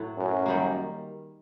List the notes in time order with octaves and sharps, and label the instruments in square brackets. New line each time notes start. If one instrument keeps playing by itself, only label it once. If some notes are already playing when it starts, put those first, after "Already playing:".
Already playing: [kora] A2 F#3 A3
[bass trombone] F#2
[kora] D#3 G3 A#3